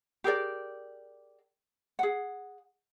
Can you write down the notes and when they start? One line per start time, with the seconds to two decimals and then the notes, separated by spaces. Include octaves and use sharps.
0.24 G4 G#4 A#4 D5
1.99 G#4 F#5